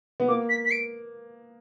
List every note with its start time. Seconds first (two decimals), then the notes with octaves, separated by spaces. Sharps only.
0.20 B3
0.28 A#3 D6
0.49 B6
0.65 B6
0.71 D7